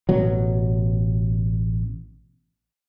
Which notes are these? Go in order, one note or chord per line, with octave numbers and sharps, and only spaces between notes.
A1 B2 F#3